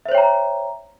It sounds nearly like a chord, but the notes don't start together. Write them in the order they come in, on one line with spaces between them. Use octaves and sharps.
E5 C5 C#5 G5 A#5